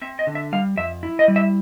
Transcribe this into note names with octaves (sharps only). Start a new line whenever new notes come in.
C4 E5
D#5
D3
E5
G3 F5
F2 E5
E4
D#5
G3
E5